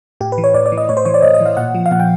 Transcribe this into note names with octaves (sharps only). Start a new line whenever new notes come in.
A2 G4
B4
E3
C#5
A2 D5
D5
E3
D#5
A2 C#5
C5
E3 C#5
D5
A2 D#5
D#5
E3
F5
A#2 F#5
F3
F5
A#2 F#5
G5